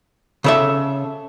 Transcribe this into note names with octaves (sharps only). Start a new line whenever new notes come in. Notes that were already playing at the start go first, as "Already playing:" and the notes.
C#3 A4 E5